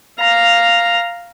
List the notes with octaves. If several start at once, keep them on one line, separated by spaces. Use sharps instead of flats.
F5 A#5